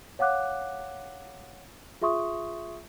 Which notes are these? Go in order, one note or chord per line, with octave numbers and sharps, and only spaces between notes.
C#5 F5 F#5 D6 F#6
F4 G#4 E5 C6 C#6 D#6